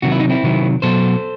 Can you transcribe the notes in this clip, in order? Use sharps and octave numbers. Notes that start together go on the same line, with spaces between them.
C3 D#3 F#3 F#4
E4
D#4
C4 E4
C3 D#3 F#3
B2 F#3 A4 C5